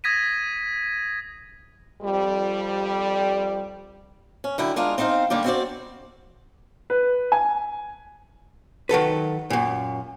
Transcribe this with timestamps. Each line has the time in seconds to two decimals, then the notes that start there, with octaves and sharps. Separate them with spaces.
0.04 D#6 G#6 A#6 B6 D#7
2.02 F2 G3
4.44 C#4
4.58 F#2 D3 E4 G5
4.76 G#3 D4 F4 A#4
4.98 C4 D#4 C5 D#5 F5
5.30 D3 G3 A#3 G4
5.44 C4 E4 F#4 B4 C5 D5
6.90 B4
7.32 G#5
8.89 D#3 F#3 A4 B4
9.50 F#2 A#2